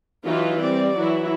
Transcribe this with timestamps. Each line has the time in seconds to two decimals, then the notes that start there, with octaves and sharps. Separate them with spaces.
0.25 E3 F#3 D#4 F4
0.62 G3 C4 D5
0.99 E3 F#3 E4